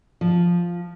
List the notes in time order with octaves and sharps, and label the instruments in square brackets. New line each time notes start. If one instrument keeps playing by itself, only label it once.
[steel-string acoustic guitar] F3